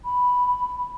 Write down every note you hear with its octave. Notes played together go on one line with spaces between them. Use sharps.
B5